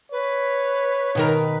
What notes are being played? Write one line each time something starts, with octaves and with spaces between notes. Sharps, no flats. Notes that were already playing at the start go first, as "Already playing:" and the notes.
B4 C#5
B2 D#3 A#4 B4